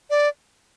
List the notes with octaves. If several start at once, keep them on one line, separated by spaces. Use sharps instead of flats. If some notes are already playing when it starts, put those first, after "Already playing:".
D5